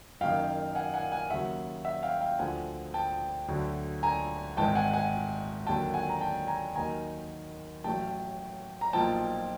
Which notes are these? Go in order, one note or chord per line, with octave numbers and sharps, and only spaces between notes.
F#1 F#2 D#3 F5 G5
F#5 G#5
F#5 G#5
F#5 G#5
D#2 C#3 F#3 E5 F#5
E5 F#5
F5 G5
F5 G5
D2 D3 F3 F#5 G#5
G5 A5
D2 D3 F#3
G#5 A#5
G#1 G#2 E3 G5 A5
F#5 G#5
F#5 G#5
D#2 D3 F#3 G5 A5
F#5 G#5
A#5
G5 A5
G#5 A#5
D#2 D#3 F#3 G#5 A#5
A1 A2 F#3 G5 A5
A#5
B1 A#2 F3 G5 A5